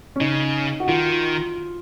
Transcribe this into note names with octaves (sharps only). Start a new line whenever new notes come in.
C#4
C#3 D#4
F#4
D#3 F4